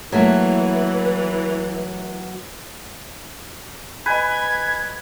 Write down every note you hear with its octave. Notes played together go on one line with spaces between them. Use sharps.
E3 F#3 A3 A#3
B4 D#5 G#5 B5 G#6